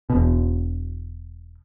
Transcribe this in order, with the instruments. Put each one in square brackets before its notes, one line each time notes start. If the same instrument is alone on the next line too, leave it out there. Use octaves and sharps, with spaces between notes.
[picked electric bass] E1 B2